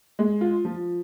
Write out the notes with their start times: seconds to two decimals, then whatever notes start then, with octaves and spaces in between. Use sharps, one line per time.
0.19 G#3
0.41 F4
0.65 F3